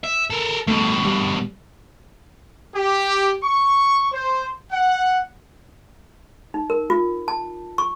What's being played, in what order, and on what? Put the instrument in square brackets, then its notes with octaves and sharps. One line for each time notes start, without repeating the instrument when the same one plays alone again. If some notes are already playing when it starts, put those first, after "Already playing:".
[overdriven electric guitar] E5
A4 A#4
[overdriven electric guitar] G2 B2 [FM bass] A3
[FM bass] G3
[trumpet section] G4
C#6
C5
F#5
[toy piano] D#4
A#4
F4
A5
C#6